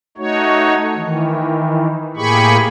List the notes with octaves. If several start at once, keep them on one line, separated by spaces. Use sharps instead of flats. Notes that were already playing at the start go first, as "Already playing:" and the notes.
A3 D#4 F#4 C#5
D#3 E3
A2 A#3 G4 G#4 B5 C#6